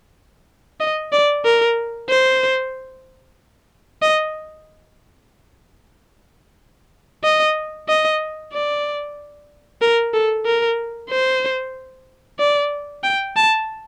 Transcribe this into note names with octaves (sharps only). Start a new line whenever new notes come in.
D#5
D5
A#4
C5
D#5
D#5
D#5
D5
A#4
A4
A#4
C5
D5
G5
A5